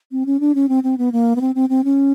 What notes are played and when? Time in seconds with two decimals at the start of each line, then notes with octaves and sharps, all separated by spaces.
0.12 C4
0.26 C#4
0.40 D4
0.55 C#4
0.69 C4
0.83 C4
0.98 B3
1.12 A#3
1.36 B3
1.41 C4
1.55 C4
1.69 C4
1.84 C#4